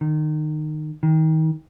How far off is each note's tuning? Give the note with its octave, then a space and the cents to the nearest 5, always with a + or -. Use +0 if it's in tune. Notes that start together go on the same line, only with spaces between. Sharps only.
D#3 -25
D#3 +25